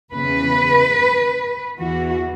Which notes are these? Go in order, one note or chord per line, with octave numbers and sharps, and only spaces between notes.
E2 C#3 E3 B4
E2 E3 F#4